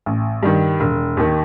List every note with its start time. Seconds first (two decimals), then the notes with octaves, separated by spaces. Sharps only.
0.06 A1
0.43 G2 D#3
0.80 E1
1.17 D#2 D#3